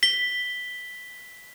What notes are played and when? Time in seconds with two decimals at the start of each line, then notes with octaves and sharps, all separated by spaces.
0.03 B6 G7